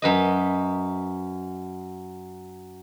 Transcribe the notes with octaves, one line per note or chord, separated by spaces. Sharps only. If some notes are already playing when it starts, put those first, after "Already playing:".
F#2 B4 D#5